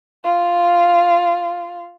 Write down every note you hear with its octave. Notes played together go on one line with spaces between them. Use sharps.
F4 F5